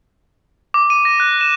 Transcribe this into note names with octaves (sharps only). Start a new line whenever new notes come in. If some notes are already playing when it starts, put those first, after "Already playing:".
D6
D#7
A#6
F#6
E7